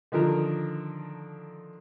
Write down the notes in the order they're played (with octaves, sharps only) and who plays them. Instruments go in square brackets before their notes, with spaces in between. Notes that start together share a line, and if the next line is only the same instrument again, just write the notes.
[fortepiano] D3 D#3 F3 A#4